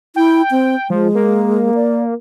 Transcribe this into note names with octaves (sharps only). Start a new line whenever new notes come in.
E4 G5
C4
F3 G#3
A#3
D5